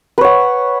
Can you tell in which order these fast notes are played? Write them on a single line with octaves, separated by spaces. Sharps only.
B4 C#5 F#5